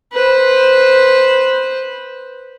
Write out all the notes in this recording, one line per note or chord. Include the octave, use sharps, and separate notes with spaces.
B4 C5